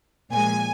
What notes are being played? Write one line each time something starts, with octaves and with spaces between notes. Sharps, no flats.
A#2 F3 G#3 G#5